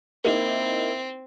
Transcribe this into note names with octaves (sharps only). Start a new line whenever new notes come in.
A#3 C4 D#4 E4